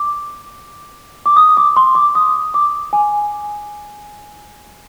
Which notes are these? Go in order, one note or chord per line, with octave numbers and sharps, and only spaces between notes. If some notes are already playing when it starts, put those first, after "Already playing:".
Already playing: D6
D6
D#6
D6
C6
D6
D#6
D6
G#5